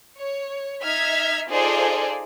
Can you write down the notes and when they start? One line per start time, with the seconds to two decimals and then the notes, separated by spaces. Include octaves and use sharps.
0.18 C#5
0.83 D#4 E5 F6 G#6 B6
1.50 D#4 F4 G#4 A4 C5 D5